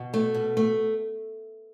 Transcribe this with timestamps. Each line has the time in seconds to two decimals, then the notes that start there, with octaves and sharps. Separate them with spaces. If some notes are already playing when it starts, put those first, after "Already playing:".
Already playing: B2
0.14 A3
0.34 B2
0.57 A3